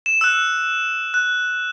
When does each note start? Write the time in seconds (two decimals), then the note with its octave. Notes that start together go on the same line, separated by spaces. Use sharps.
0.06 E7
0.21 E6 F#6
1.14 F#6